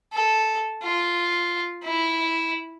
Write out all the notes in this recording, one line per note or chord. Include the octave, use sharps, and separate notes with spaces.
A4
F4
E4